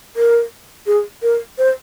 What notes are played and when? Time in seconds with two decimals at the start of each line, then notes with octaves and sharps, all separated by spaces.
0.16 A#4
0.87 G#4
1.23 A#4
1.58 C5